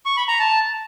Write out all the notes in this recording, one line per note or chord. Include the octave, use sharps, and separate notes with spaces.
C#6
B5
A#5
A5